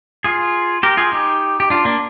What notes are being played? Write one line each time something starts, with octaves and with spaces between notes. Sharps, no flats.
F4 G#4
G4 A#4
F4 G#4
D#4 G4
G4
D4 F4
A#3 D4